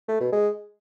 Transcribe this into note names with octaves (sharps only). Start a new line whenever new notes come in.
A3
B2
G#3